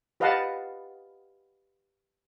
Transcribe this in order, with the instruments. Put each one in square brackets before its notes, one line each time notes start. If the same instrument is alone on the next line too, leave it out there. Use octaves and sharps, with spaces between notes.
[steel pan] G4 B4 D#5 F5 F#5 A5